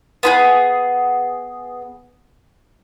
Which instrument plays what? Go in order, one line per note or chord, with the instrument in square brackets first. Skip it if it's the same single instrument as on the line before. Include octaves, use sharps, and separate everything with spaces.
[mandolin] B3 E4 G#4